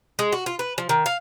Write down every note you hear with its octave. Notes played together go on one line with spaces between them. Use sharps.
G#3
F#4
F4
B4
F3
D#3
F5